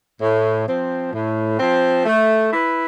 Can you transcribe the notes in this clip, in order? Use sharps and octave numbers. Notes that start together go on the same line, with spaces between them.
A2
F3 C4
A2
F3 C4
A3
E4 B4